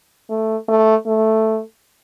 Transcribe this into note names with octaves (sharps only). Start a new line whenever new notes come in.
A3
A3
A3